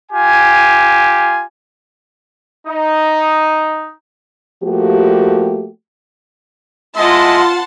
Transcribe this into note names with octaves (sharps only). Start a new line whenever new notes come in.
F4 G4 G#5
D#4
F3 A3 A#3 F#4 G4
G#3 E4 F4 D#5 F#5 A5 C6